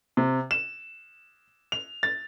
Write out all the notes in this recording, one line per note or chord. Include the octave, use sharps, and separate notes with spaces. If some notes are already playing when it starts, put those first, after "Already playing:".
C3
E7
F7
A6